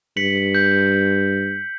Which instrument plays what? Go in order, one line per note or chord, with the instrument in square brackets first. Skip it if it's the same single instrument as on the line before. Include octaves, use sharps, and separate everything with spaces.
[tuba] G2 [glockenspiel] B6 C#7 F#7
[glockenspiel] G6